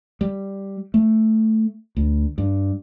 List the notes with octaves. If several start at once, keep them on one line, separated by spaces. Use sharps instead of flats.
G3
A3
D2
G2